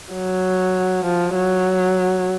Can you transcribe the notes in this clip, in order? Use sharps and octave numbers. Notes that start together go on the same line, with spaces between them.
F#3
F3
F#3